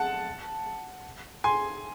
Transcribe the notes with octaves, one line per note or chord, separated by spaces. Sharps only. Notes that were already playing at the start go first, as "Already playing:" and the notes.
Already playing: F#5 A5
G#5 C6